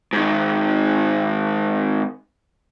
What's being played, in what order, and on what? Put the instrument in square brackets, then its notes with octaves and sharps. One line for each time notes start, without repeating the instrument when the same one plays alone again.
[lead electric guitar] G#2 D#3